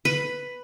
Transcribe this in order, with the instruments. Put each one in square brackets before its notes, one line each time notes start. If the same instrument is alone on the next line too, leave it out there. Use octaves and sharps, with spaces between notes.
[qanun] B4